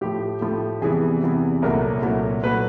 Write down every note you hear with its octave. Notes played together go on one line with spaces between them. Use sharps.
A2 F3 A3 G4
A2 F3 A3
E2 C3 E3 G3 B3 G#4
E2 C3 E3 G3 B3
C2 A#2 F#3 A3 A#4
C2 A#2 F#3 A3
A#2 F#3 A3 B4